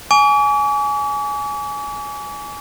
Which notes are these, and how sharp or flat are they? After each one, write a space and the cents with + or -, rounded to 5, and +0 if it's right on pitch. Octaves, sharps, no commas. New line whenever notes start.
G#5 +10 D6 -45